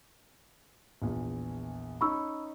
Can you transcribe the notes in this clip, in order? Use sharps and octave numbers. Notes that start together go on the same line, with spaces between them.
A#1 E2
C#4 D#4 B5 C#6 E6